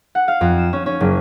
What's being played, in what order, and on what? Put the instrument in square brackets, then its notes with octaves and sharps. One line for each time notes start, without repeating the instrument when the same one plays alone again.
[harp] F#5
F5
F2
E7
C#4
C#4
F#1